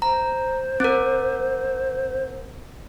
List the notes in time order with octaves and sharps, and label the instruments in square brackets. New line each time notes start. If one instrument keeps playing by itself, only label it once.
[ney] C5 [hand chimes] A#5
[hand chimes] C4 A#4